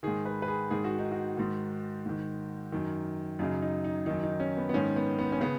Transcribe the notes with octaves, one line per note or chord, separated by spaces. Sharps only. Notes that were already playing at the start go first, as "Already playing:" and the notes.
G#2 D#3 G#4
B4
B4
G#4
G#2 D#3 G#4
F#4
D#4
F#4
G#2 D#3
G#2 D#3
F#2 D#3
F#2 C#3 D#4
D#4
D#4
F#2 D#3 D#4
D#4
C#4
B3
B3
G#2 D#3 C#4
B3
B3
C#4
C#3 B3